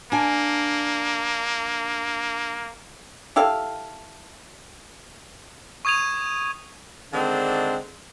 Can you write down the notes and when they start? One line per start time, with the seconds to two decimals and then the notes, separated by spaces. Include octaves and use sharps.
0.12 A#3 D4 G#5
3.36 E4 G4 A4 F5
5.85 C#6 D#6 G#6 D#7 F7
7.13 D3 D#3 G#3 C4 D4